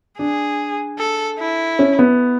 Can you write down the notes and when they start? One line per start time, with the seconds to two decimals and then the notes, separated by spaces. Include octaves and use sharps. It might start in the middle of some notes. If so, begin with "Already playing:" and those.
0.19 D4 G#4
0.99 A4
1.39 E4
1.79 C#4
1.99 B3